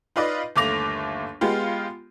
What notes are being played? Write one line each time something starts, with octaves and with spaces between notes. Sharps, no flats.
D#4 F4 B4 D5 D#5
G1 D#2 A3 D6 A#6 F7
G#3 B3 F4 G4